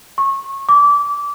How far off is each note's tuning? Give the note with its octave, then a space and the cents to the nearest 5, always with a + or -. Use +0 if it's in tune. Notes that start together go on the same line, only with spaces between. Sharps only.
C#6 -25
D6 -25